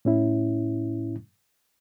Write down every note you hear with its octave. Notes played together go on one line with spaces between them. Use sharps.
A2 C#4 E4